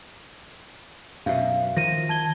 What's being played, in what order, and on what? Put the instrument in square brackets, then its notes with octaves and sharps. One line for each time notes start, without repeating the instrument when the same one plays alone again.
[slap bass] F#2 B2 [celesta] E5 F5
[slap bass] D#3 F3 [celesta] A#6 D#7
[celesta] A5 G#6 G7